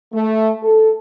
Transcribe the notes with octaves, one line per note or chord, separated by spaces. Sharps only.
A3
A4